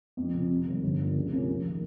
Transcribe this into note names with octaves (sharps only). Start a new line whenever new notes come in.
F2
C#3 F3 C4
C3
D#3 G3
G1
G2 F3 A#3
C#2
C3 F3 A#3 C#4
F1
D#3 A#3